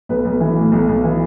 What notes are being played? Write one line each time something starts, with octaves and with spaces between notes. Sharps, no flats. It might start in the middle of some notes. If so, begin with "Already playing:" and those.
B1 B4
B1
E3
A2
B1
B1
E3